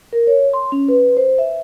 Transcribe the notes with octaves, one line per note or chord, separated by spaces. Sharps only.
A#4
C#5
C6
C#4
B4
C5
E5